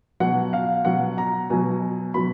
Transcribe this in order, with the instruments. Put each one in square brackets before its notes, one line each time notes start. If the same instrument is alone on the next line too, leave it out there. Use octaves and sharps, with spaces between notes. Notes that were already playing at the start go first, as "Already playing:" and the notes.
[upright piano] B2 F#3 F#5
F5
B2 F#3 F#5
A#5
B2 F#3 G#5
B2 F#3 B5